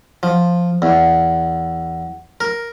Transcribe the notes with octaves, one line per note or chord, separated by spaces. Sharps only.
F3
E2
A#4